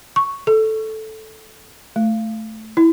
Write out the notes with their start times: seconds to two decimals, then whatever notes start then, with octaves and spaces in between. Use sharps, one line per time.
0.16 C#6
0.47 A4
1.96 A3
2.77 E4